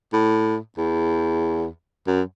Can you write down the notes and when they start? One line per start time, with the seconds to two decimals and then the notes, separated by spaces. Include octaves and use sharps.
0.13 A2
0.78 E2
2.07 F#2